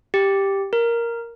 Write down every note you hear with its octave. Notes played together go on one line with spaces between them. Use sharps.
G4
A#4